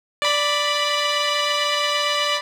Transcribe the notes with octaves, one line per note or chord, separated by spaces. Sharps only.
D5 B5